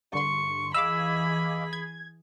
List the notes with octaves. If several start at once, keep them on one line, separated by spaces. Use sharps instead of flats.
G2 D3 C6 C#6
E3 G#4 D#5 F5 B5 D6 E6
G#6